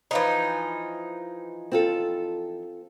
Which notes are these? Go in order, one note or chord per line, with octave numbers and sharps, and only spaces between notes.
E3 F3 D#4
C4 F4 A4